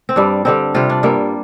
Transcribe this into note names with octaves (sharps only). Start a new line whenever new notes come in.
C4
G2 G3 D4
G2 D3 G3 C4
C3 G3 F4
D4
G2 G3 A#3